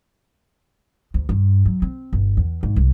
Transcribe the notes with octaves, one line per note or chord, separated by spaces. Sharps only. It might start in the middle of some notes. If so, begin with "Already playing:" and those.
D2
G2
F#3
C4
G1
E2
G#2
C2